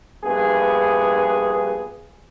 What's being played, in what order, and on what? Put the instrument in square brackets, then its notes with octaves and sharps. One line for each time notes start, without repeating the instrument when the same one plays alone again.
[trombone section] A#1 G2 B3 G#4